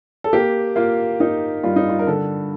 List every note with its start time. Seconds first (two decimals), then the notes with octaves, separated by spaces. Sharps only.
0.24 A4
0.33 A#3 G4
0.76 A#3 F4
1.20 A#3 D#4
1.63 G2 F4
1.76 D#4
1.89 F4
1.99 A#4
2.06 D3 A4